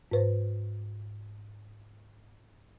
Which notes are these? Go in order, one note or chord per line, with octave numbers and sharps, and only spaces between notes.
G#2 B4 C5